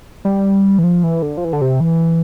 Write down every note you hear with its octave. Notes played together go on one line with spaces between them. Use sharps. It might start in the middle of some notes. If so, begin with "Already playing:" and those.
G3
E3
F3
E3
D3
F3
E3
D3
C3
E3